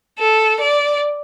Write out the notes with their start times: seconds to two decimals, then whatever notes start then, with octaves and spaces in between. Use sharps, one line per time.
0.19 A4
0.60 D5